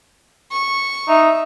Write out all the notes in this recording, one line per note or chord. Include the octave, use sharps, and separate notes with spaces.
C#6
D#4 E5